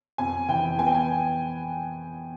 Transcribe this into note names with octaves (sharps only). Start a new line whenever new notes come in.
F2 G#5
E3 G5
B3 G#5
G5
G#5